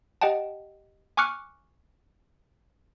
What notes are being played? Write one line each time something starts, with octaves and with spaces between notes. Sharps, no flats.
G4 D#5 F#5 G5 A5
G#5 C#6 D6 F6 F#6 C#7